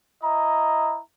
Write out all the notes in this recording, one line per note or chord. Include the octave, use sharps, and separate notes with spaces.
E4 D#5 A#5